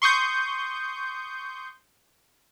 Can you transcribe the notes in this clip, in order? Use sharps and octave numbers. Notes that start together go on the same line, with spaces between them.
C6 C#6 D#6 G6